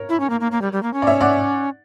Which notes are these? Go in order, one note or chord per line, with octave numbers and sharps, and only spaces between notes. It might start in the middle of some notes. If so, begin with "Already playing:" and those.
Already playing: A#4 C#5
E4
C#4
A#3
A#3
A#3
G3
G3
A#3
C#4
D5
C#5 E5
D5 F#5